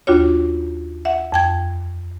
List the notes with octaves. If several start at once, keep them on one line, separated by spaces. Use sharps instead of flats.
D#2 D4 F4 F#4 C#5
E5 F#5
F2 G5 G#6